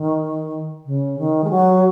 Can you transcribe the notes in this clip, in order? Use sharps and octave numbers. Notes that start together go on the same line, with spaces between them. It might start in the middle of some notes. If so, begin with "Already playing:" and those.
Already playing: D#3
C#3
D#3
G#3
F#3